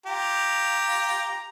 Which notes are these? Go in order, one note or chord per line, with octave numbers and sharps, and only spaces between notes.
F4 G4 A#5